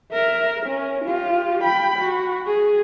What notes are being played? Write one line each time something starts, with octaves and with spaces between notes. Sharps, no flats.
A#4 E5
C#4
F4 G4
G5 B5
F#4
G#4